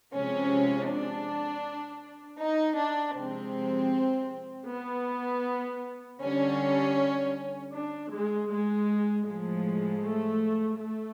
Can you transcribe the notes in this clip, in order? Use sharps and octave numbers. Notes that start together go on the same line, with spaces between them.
C3 F3 G#3 C#4
D4
D#4
D4
C3 F3 G#3 C4
B3
D3 G3 C#4
D4
G#3
G#3
A2 F3 G#3
A3
A3